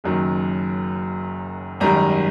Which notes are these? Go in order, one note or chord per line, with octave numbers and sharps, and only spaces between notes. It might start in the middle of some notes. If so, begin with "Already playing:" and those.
F#1 F#2 D#3 F#3
G#1 F#2 D#3 G3 A#5